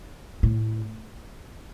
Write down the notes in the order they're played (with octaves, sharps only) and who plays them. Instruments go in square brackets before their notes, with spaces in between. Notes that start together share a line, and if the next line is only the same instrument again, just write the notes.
[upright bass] A2